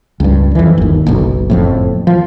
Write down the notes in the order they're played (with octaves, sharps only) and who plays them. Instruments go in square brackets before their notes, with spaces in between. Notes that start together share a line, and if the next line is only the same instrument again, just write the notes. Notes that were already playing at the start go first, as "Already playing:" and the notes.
[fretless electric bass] C#2 G2
F2 E3
G1 D#2
F#1 B1
F#1 F2 A2
F3